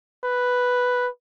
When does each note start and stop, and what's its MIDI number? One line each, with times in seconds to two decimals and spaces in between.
0.24 1.09 71